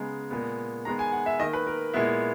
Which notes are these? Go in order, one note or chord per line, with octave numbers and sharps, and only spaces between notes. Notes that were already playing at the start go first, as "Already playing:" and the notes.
Already playing: C#3 G#3 B3 A#5
A#2 G#3 B3
D#3 G#3 B3 A#5
G#5
F#5
E5
D#3 A#3 D#5
B4
A#4
A#2 G#3 B3 E4